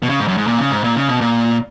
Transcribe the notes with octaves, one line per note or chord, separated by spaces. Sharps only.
B2
C#3
G#2
F#2
G#2
A#2
C#3
G#2
A#2
C#3
B2
A#2